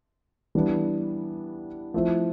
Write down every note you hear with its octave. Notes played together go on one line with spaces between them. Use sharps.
E3 G3 B3 D4
F3 A3 C4 E4